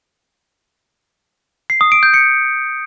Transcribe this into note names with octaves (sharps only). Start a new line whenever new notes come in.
C7
D#6
D7
G6
C#7